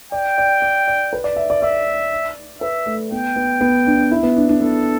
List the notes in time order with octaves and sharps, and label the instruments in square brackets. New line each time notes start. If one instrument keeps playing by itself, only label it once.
[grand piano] D5 [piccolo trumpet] G5
[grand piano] D5
D5
D5
B4
D5
E5
D5
[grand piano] D5 [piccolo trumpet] E5
[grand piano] B4 [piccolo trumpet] E5
[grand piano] A3
[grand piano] B3 [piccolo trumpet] G5
[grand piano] B3
B3
D4
E4
B3
D4
D4
[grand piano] B3 [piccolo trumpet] A4